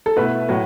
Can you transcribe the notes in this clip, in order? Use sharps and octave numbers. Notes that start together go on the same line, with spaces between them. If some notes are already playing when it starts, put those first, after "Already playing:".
A4
B2 A3 E4 B4
A2 F#3